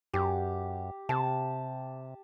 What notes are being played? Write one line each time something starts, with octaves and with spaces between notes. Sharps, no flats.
F#2 G4
C3 A5